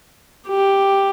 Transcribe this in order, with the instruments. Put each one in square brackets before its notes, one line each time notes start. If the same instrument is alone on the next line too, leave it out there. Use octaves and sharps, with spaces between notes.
[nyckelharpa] G4